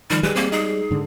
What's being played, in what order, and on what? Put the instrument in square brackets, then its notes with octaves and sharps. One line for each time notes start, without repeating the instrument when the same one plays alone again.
[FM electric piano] D#3 F3 F6 [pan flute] G3
[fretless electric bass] G3 G#3 [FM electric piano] G#4 [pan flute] B4
[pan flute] A#3 [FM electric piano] C4 G#4
[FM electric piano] D#4 [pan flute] G#4
[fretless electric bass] G#2 D3